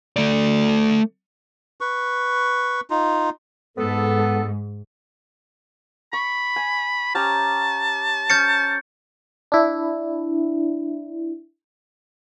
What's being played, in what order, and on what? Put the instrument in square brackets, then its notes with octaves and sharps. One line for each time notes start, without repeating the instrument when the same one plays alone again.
[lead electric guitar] A3 D5
[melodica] B4 C#6
D#4 F4
[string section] G#2 [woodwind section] B3 A4
[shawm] B5 [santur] C#6
[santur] G#5
[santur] C#4 G4 A#5 [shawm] A5
[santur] C#4 [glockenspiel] G6 A6 C#7
[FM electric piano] D4 E4